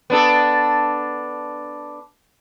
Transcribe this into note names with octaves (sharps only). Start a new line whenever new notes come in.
B3 D4 A4